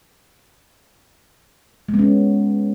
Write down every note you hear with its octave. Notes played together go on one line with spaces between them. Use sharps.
G#3
B3
C#4